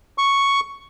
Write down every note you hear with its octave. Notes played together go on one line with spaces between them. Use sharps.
C#6